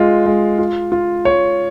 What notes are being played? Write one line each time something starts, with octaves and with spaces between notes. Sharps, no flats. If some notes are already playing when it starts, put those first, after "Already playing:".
Already playing: G#3 F4
G#3
F4
F4
C#5